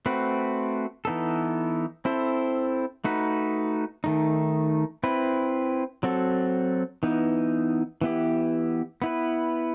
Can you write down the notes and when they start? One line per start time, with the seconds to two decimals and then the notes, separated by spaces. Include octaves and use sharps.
0.06 A3 C4 F#4 B4
1.05 E3 B3 D#4 A4
2.05 C4 E4 A4 C5
3.04 A3 D#4 F#4 B4
4.04 D#3 A3 D#4
5.04 C4 E4 B4
6.03 F#3 C4 F#4 A4
7.03 E3 B3 D#4
8.01 E3 B3 E4 G4
9.02 B3 E4 B4